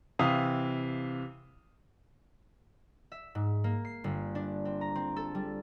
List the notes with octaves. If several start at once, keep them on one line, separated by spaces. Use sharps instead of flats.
C3 E3 F5 D#6
E5
G#2
A#3
C7
G1
D4
C4
A#5
C4
A4
G3